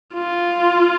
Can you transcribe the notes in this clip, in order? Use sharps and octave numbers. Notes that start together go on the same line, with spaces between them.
F4